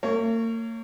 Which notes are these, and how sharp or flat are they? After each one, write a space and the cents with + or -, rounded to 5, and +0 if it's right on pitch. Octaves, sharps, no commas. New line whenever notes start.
A#3 -40 C#5 +0